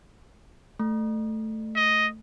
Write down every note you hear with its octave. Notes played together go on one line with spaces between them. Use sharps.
A3
D#5